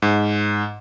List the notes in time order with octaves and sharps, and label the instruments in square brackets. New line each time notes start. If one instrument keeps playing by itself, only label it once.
[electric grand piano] G#2